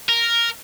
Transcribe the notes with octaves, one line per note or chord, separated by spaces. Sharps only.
A#4